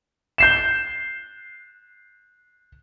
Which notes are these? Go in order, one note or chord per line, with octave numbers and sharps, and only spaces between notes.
G6 C7 E7